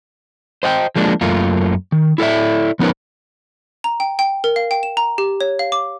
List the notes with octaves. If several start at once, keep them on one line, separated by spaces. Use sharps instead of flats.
C5 D#5 F#5 G5
F3 G#3 A#3 D4
F#2 A3 A#3 F4
D#3
E4 A4 D5 E5
F3 B3 C#4 D#4 A#4 B4
A#5
G5
G5
A#4
F5
G5
E7
A#5
G4
C#5
F5
D6